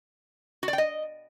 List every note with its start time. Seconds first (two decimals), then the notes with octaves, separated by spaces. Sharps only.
0.63 F#4
0.68 D5
0.73 G5
0.78 D#5